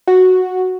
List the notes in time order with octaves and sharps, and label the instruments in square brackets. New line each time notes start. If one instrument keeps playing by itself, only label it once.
[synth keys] F#4